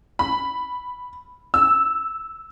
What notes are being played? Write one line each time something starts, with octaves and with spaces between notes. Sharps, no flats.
B5
E6